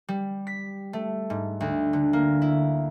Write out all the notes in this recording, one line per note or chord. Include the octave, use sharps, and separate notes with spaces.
G3
B6
A3
G#2
D2
D3
A#3
E4